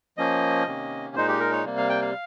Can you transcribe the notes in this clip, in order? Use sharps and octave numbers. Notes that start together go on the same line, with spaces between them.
F3 A#3 C#4 D#5
C3 D#3 A#3 C#4
A#2 G#3 D#4 C5
G4
A#4
C#5
C3 G3 A#3
F5
G5
F5